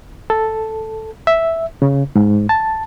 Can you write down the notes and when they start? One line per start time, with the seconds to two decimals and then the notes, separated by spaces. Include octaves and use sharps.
0.30 A4
1.27 E5
1.82 C#3
2.16 G#2
2.49 A5